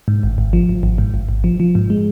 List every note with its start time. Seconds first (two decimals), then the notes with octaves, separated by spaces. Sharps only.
0.08 G#2
0.23 G#1
0.38 G#1
0.53 F3
0.69 G#1
0.83 G#1
0.98 G#2
1.14 G#1
1.29 G#1
1.44 F3
1.60 F3
1.75 G#2
1.90 G#3